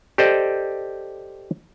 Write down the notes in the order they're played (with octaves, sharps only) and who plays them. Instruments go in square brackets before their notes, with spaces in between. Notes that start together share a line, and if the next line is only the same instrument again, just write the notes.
[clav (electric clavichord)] G4 A4 C5 D5 D#5